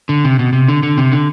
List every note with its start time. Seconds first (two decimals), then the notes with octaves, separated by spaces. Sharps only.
0.09 D3
0.24 C3
0.39 B2
0.53 C3
0.68 D3
0.83 D3
0.97 C3
1.12 D3